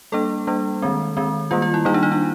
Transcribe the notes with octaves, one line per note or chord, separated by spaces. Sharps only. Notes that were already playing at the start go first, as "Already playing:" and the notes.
G3 A#3 D4 A4
G3 A#3 D4
D#3 G#3 C4
D#3 G#3 C4
D#3 G3 A#3 F4
F4
E4
D#3 G3 A#3 D#4
D4
D#4
D4